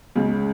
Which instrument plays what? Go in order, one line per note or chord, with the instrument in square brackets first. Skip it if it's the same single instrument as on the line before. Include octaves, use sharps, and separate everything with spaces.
[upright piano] C#2 C#3